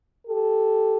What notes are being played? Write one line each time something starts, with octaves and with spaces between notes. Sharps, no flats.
G4 A4